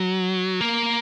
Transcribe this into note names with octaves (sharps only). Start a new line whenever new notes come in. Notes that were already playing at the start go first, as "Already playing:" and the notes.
Already playing: F#3
A#3